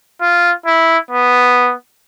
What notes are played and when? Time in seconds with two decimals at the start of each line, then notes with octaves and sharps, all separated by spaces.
0.21 F4
0.66 E4
1.11 B3